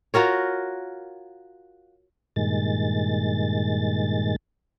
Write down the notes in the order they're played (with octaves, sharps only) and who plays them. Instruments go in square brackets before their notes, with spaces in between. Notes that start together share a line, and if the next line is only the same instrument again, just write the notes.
[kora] F4 F#4 A#4 C#5
[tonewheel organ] G2 A#2 D#3 G#3 A6